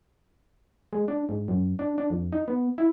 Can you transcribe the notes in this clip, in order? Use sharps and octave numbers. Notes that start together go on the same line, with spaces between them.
G#3
D4
G#2
F#2
D4
D4
F2
D#4
B3
E4